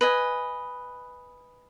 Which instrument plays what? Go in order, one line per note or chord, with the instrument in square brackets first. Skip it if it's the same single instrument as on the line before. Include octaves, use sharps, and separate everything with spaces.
[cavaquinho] B4 D#5 G#5